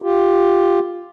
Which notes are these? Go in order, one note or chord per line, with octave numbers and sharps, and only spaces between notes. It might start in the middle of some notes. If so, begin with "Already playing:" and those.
F4 G4